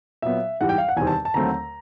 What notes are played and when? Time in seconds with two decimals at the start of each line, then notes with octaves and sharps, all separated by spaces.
0.22 A#2 F#3 B3 E5
0.61 G#2 E3 G3 F#5
0.69 G5
0.78 F5
0.89 F#5
0.97 E2 C3 D#3 G3 C4 G#5
1.07 A5
1.25 A5
1.34 D#2 D3 F#3 A3 C4 A#5